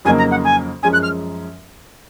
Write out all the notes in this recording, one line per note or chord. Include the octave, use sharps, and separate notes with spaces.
F2 C#3 F#3 A#3 D#4 G#5
A#5
F#5
G#5
F#2 F3 G#3 C#4 G#5
F#6
F6